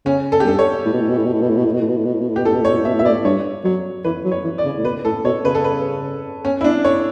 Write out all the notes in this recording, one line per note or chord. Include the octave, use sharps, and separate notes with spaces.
C#3 C#4
A4
G4
G2 A4
C#5
A2
B2
A2
B2
A2
B2
A2
B2
A2
B2
A2
B2
A2
B2
A2
B2
A2
B2
A2
B2 G4
A2 A4
B2
A2
C#5
B2
A2
B2 E5
A2
E5
B2 D5
A2
G2 C#5
F#3 C#5
E3 B4
F#3
C#5
E3
D5
C#3
A2
B2 B4
A2 A4
B2 C#5
C#3 B4
A4
B4
C#4
E4
D4
C#5